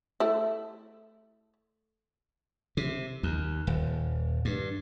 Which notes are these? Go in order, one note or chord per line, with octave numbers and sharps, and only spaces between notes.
A3 E4
C3
D#2
D#1
G2